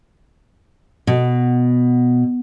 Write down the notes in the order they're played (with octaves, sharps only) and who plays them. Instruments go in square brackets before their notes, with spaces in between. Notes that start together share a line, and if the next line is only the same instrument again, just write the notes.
[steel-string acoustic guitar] B2